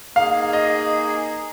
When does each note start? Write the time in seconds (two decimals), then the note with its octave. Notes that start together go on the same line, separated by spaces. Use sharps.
0.16 A#3 D#4 G#4 F5
0.53 D#5